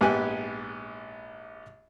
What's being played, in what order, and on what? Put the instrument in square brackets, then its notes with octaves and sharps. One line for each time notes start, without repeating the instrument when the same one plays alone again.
[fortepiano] A#1 G#2 B3 G4 G#5 F#6